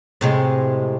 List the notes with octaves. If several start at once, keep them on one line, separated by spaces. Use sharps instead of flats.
A2 C3 G#3